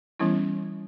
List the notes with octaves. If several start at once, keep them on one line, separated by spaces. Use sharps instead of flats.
E3 G3 B3 C#4 E4